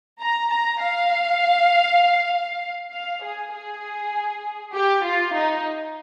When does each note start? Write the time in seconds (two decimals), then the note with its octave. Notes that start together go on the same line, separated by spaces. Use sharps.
0.21 A#5
0.51 A#5
0.81 F5
2.92 F5
3.23 G#4
3.53 G#4
4.74 G4
5.04 F4
5.35 D#4